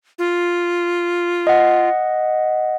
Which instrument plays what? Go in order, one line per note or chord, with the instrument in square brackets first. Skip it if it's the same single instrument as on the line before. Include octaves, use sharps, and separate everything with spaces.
[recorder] F4
[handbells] D#5 F#5